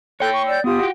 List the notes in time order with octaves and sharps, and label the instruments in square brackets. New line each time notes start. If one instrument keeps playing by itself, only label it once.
[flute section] A4 F#6 G6 [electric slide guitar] C#5 G5
[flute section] C#6
D5 E6 G6
[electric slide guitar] B3 [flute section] F4 G4 D#6
[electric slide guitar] F#4 G5